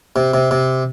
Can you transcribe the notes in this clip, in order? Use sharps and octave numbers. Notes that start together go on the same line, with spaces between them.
C3
C3
C3